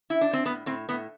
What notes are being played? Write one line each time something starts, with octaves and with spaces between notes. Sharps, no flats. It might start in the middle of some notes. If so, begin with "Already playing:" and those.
E4
D4
C4
A2 B3
A2 C4
A2 B3